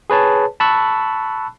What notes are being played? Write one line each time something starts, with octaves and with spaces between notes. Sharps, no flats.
G#4 B4 C#5 A5
A5 B5 C#6 E6 F#6